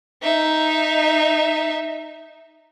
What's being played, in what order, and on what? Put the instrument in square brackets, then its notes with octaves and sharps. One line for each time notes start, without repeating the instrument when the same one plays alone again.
[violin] D#4 E5